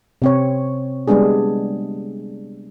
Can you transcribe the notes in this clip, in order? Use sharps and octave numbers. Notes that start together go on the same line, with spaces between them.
C3 C4 C#5
G3 G#3 B3 D4 G#4